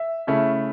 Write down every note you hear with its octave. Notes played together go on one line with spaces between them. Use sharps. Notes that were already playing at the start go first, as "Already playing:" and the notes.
Already playing: E5
C#3 A3 C#4 E4